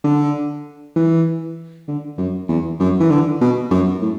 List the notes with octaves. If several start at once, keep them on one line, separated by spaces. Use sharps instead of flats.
D3
E3
D3
F#2
E2
F#2
E3
D3
B2
F#2
A2